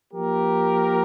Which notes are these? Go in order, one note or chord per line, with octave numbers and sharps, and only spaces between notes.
F3 A#3 G4 A#4